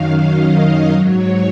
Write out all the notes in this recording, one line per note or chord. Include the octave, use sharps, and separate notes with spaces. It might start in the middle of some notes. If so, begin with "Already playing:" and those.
Already playing: F#2 D#3 F#3 F5
D#5
G#2 F#3 C#5